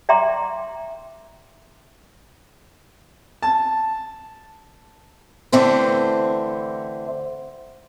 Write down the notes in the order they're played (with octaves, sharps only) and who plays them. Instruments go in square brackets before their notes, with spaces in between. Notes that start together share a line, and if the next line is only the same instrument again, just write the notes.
[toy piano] D5 E5 G5 A#5 C6 D6
[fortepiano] A5
[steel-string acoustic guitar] D3 E3 A3 C4 C5